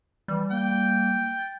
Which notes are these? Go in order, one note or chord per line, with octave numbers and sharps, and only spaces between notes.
E3 G3
A#3 G5
A6